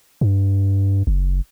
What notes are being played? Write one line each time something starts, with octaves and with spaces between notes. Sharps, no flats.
G2
F#1